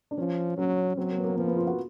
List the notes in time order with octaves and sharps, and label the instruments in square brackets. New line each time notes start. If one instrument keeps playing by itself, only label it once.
[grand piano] D4
[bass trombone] F3 [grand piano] C#4
[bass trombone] F#3 [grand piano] C#4
[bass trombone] F#3 [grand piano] C4
[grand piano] A#3
B3
A#3
[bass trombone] F3 [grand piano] B3
[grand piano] B3
F4
F#4